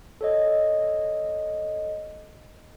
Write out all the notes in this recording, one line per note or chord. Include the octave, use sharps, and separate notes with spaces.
A4 C#5 D#5